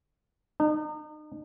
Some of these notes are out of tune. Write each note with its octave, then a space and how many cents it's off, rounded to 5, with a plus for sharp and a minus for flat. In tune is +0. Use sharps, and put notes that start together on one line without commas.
D#4 -35